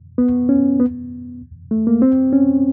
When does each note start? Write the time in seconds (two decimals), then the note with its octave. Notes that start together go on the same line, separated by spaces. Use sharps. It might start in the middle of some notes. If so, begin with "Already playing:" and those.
0.18 B3
0.49 C#4
0.80 B3
1.71 A3
1.87 A#3
2.02 C4
2.33 C#4